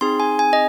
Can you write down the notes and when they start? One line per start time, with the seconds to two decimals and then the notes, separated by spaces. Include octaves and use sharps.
0.01 C4 D#4 G#4 C6
0.20 G#5
0.39 G#5
0.53 D#5